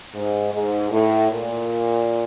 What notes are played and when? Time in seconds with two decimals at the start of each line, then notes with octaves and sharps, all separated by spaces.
0.14 G#2
0.52 G#2
0.90 A2
1.30 A#2